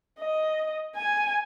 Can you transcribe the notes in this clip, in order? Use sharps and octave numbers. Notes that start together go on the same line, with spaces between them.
D#5
G#5